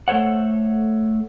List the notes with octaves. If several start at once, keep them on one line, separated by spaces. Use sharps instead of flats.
A3 A4 C5 C#5 F#5